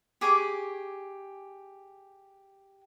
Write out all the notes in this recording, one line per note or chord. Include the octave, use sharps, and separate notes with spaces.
G4 G#4 C#6 D6